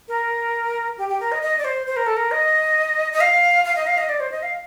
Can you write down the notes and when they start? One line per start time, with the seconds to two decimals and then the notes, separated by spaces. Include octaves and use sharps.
0.08 A#4
0.98 G4
1.09 G4
1.20 A#4
1.32 D#5
1.42 D#5
1.58 D5
1.65 C5
1.87 C5
1.96 A#4
2.06 A4
2.17 A#4
2.31 D#5
3.13 D#5
3.21 F5
3.65 F5
3.76 D#5
3.87 F5
3.98 D#5
4.09 D5
4.20 C5
4.32 D#5
4.43 F5